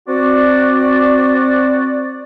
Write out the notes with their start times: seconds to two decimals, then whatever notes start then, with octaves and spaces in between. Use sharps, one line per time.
0.08 C4 F#4 D5